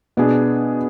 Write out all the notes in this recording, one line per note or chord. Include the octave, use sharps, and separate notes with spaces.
B2 B3 D4 G#4